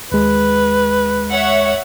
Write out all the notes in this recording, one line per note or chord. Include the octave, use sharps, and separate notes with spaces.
D#2 G#3 B4
C#5 E5 F#5